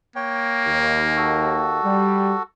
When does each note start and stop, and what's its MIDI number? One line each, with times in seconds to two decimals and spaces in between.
0.16 1.65 58
0.16 0.91 73
0.16 0.91 79
0.65 1.78 39
1.16 2.43 66
1.16 2.43 69
1.84 2.33 55